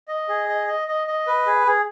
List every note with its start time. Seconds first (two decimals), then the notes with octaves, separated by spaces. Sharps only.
0.08 D#5
0.29 G#4
0.48 D#5
0.67 D#5
0.88 D#5
1.07 D#5
1.27 B4
1.46 G#4
1.66 G#4